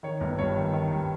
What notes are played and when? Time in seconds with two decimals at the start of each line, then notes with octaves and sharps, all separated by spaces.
0.03 D#3 C#5
0.21 G1
0.39 G2 C#5
0.57 D#3
0.73 D#3
0.91 G2